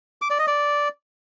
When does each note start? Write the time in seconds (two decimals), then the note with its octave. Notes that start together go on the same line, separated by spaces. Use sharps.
0.22 D6
0.30 D5
0.39 D#5
0.47 D5